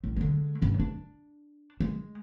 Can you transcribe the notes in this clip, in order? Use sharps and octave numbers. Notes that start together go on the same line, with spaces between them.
A1
D3 G#3
G2 C#4
D4
G#3